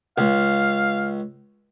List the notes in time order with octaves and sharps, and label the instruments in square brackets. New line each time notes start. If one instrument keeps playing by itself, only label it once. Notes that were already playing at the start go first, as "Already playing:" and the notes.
[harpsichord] C#2 [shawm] F5